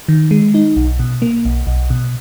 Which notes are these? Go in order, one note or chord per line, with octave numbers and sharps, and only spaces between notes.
D#3
G#3
D#4
B1
B2
A#3
B1
B1
B2